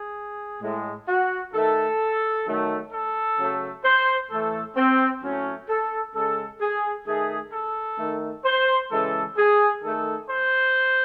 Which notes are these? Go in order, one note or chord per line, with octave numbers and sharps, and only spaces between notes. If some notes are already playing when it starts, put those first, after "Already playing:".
Already playing: G#4
A2 G#3
F#4
D#3 A3 A4
D#3 F#3 A3
A4
C#3 F#3 A3
C5
A2 E3 A3 A4
C4
A2 F#3 A3 C#4
A4
C#3 G#3 A4
G#4
D#3 A3 G#4
A4
D#3 A3
C5
C#3 E3 G#3 A4
G#4
D#3 A3 A4
C5